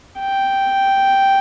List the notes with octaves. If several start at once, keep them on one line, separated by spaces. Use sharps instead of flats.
G5